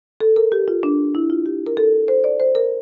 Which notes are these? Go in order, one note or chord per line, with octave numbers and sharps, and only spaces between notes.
A4
A#4
G4
F4
D4
E4
F4
G4
A#4
A4
C5
D5
C5
A#4